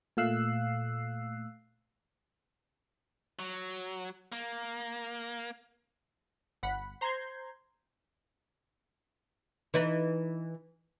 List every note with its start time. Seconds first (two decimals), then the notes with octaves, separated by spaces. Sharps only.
0.17 A#2 A3 F5 E6 F#6 C7
3.39 F#3
4.32 A#3
6.63 G1 F#5 B5
7.01 C5 A#5 C6 G6 G#6 C7
9.74 E3 D#4 B4